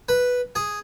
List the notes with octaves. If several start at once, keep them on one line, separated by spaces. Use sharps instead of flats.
B4
G#4